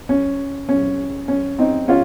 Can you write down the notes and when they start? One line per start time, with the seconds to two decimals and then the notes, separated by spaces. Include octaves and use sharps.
0.09 C#4
0.69 C#4
1.28 C#4
1.59 C4 D#4
1.88 C#4 F4